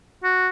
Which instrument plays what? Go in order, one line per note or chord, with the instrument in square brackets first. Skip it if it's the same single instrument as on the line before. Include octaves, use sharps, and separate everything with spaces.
[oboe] F#4